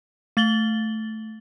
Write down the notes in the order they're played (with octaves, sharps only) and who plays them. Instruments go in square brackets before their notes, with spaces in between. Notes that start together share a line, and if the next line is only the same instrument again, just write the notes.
[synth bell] A3 A6 F#7 G7